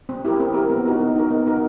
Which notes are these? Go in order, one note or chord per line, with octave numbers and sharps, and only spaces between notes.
C4
E4 G4 A#4
C4
E4 G4 A#4
B3
D#4 F#4 A#4
B3
D#4 F#4 A#4
B3
D#4 F#4 A#4